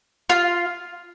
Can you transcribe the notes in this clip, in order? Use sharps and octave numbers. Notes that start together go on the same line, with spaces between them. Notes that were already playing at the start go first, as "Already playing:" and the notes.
F4